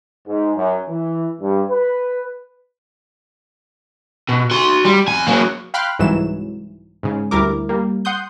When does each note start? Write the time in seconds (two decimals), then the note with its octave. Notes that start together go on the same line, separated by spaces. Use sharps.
0.27 G#2
0.56 F#2
0.89 E3
1.41 G2
1.69 B4
4.29 B2
4.51 F#4 C6
4.85 G3
5.08 F2 G#5
5.27 F#3 A#3
5.74 F5 G5 B5 C6 F6 F#6
5.99 C2 G#2 E3 F#3 E7
7.03 G#2 C#3
7.31 D2 G3 E4 A#4 D6
7.69 G3 A#3
8.05 F#5 C6 D#6 G6